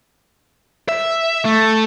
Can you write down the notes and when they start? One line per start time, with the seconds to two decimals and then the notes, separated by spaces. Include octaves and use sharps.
0.88 E5
1.45 A3